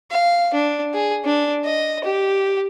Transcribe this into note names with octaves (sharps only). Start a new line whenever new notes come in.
F5
D4
G#4
D4
D#5
G4